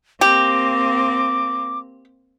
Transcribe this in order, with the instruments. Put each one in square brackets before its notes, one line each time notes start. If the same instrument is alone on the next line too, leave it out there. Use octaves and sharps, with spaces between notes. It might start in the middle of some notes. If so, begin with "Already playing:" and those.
[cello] A#3 C4 [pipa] G4 [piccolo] D6